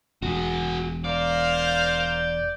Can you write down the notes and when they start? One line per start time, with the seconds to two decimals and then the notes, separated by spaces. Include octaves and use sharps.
0.22 E1 F#4 G#4
1.04 A#4 C5 D5 F5
1.54 G6